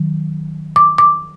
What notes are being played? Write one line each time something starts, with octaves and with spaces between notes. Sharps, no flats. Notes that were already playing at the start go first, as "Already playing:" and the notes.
Already playing: D#3 F#3
D6
D6